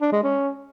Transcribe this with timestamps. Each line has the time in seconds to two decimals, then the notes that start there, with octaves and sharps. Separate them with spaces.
0.01 D4
0.12 G#3
0.23 C#4